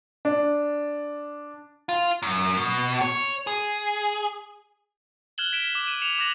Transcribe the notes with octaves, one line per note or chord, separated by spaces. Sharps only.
D4
F4
F#2
B2
C#5
G#4
F6 F#6 G#6 E7 F#7 G7
G#6 B6 D7 E7 G7
D6
D#7
D6 C#7 F7
D6 F#6 G#6 A#6 F#7